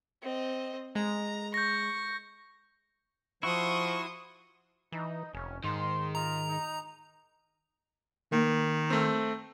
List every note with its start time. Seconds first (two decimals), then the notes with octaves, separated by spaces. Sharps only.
0.22 C4 D#5
0.95 G#3 A#5
1.54 C#6 G6 A#6
3.43 F3 E4 F#4 C6 C#6 D#6
4.92 E3 D#4
5.33 F1 C#4
5.64 G#2 D#3 C6
6.15 F4 D#5 A#5
6.48 D#4
8.32 D#3 A#3
8.90 A3 C4